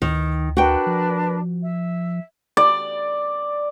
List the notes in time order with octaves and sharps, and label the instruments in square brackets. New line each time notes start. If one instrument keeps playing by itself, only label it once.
[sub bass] D2 [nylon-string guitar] D#3
[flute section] D4 A#4 B4 [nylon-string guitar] F#4 G5
[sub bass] F3
[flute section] E5
[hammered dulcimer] D5